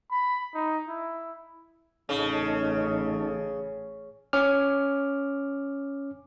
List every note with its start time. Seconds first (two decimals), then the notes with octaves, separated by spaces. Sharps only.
0.12 B5
0.55 D#4
0.89 E4
2.09 A1 C#3 C#4 D#4 A4
4.33 C#4 D6 F6